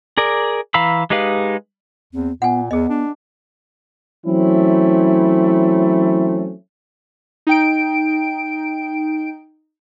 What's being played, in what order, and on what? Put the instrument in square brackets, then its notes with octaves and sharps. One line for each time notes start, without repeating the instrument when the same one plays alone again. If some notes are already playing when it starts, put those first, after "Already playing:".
[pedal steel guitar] G#4 A#4 D5
E3 F5 A#5 B5 E6
G#3 D#4 G4 B4 F5
[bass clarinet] E2 [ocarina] C4
[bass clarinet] A#2 [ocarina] B3 [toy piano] F#5 G#5
[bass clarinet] E2 [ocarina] B3 [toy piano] G#4 D#5
[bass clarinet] D4
[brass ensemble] E3 F#3 A3 C4 C#4 E4
[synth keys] D#4 G5 D7